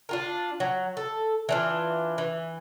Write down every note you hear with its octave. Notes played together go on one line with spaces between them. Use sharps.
D4 F4 A#4
F#3
A4
E3 D4 F4
E3